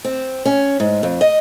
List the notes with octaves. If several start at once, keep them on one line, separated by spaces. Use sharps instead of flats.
C4
C#4
G#2
F2
D#5